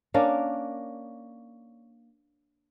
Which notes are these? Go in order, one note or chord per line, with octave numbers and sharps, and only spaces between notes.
A#3 C#4 D4 A#4